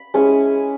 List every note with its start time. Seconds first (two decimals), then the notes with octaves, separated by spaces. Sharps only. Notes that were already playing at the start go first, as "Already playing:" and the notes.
Already playing: B5
0.14 G#3 C#4 E4 G#5